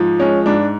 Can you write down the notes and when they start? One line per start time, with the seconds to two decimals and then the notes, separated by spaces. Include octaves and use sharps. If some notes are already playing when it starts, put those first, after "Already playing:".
Already playing: G#2 F3
0.19 G#3 C#4
0.46 G#2 D4